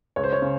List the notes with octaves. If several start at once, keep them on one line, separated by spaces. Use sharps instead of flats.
C#2 C#5
C5
C#5
C#3